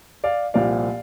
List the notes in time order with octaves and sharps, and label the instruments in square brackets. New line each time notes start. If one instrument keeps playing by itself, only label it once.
[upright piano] D5 F5
C2 A#2 F3 D5 F5